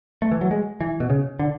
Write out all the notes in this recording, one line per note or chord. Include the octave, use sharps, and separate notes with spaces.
A3
E3
F#3
G#3
E3
B2
C#3
D3